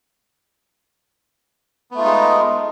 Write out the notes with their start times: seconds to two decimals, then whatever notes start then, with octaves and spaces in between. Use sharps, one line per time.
1.91 B3
1.95 A3
1.98 F4
2.02 D#4
2.05 G#3